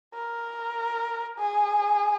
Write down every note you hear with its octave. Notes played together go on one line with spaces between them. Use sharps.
A#4
G#4